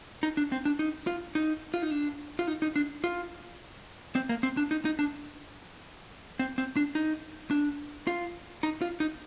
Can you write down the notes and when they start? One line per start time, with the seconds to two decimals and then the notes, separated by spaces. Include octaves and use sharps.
0.23 D#4
0.37 D4
0.52 C4
0.65 D4
0.79 D#4
1.07 F4
1.35 D#4
1.74 F4
1.82 D#4
1.91 D4
2.39 F4
2.47 D#4
2.62 D#4
2.76 D4
3.04 F4
4.15 C4
4.29 A#3
4.43 C4
4.57 D4
4.71 D#4
4.85 D#4
4.99 D4
6.39 C4
6.58 C4
6.76 D4
6.95 D#4
7.51 D4
8.07 F4
8.63 D#4
8.82 F4
9.00 D#4